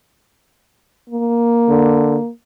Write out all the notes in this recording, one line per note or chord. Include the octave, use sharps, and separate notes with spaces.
A#3
D3